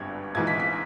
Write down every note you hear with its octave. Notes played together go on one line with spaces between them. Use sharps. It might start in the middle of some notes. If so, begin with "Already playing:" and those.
Already playing: G#1 G2 G3 B3 G#6
A#1 G#2 E3 G#6
B6
B6